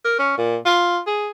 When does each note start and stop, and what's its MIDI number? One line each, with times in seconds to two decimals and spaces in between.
0.05 0.17 70
0.19 0.35 61
0.38 0.56 46
0.66 0.99 65
1.07 1.29 68